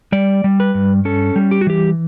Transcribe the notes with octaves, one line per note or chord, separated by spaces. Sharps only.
G3 D5
G3
B4
G2
C#4 A4
G3
G4
F#4
E3 G4